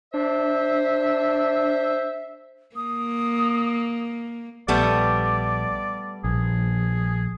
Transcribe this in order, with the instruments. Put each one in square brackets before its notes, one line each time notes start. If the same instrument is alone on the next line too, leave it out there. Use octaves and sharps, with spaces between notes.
[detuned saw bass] D4 [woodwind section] C5 E5
[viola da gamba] A#3 [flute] D#6
[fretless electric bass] A#1 [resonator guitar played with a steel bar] G3 A3 B3 [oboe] D5
[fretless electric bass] A#1 [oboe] G#4